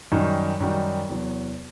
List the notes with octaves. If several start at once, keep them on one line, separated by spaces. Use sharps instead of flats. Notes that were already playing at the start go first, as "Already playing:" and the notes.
F#2 D#3 G3 D#4 F#4
F#2 D#3 G3 D#4 F#4
E2 C3 F#3